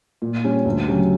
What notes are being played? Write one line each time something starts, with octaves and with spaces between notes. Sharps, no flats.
A#2
G3 C#4
D2
C#3 F#3 C#4 G4